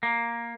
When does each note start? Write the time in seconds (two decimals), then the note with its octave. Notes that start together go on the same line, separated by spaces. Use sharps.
0.03 A#3